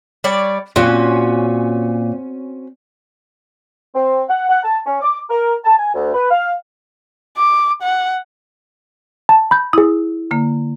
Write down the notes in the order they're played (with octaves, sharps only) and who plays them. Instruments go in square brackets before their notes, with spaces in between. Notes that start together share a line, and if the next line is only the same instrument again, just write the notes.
[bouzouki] G3 C#5 D5
[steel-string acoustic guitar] A#2 [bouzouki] C4 C#4 F#4
[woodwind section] C4
F#5
F#5
A5
C#4
D6
A#4
A5
G#5
D2
B4
F5
[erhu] D6
F#5
[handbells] A5
B5 G6
[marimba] E4 [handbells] G#4 D#6
[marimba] D3 A#3